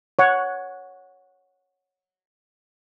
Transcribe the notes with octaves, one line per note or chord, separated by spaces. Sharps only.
C#5 F#5